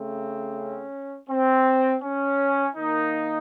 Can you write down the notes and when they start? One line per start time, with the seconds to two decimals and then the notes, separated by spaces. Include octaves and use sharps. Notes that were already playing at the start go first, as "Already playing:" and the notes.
Already playing: C#3 A3 C4
0.55 C#4
1.29 C4
2.03 C#4
2.75 D#3 A#3 D#4